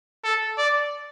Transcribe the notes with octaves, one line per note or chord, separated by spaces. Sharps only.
A4
D5